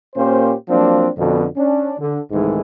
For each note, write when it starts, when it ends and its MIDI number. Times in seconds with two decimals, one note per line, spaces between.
0.16 0.52 46
0.16 0.52 58
0.16 0.52 61
0.16 0.52 67
0.16 0.52 72
0.68 1.08 53
0.68 1.08 54
0.68 1.08 58
0.68 1.08 60
0.68 1.08 62
1.17 1.44 41
1.17 1.44 47
1.17 1.44 50
1.56 1.93 61
1.56 1.93 62
1.98 2.19 50
2.31 2.61 36
2.31 2.61 44
2.31 2.61 51
2.31 2.61 52
2.31 2.61 56
2.31 2.61 57